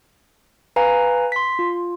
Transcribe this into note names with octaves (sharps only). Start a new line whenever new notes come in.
B4 F5 G#5 A#5
C6 B6
F4